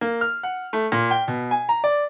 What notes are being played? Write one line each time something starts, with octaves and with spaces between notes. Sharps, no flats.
A#3
F6
F#5
A3
A#2
G5
B2
G#5
A#5
D5